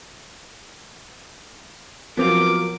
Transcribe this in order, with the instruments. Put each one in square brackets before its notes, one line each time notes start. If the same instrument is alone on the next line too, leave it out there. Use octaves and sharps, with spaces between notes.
[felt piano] F3 F#3 [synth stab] B3 C4 F4 [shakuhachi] A#4 [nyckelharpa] D6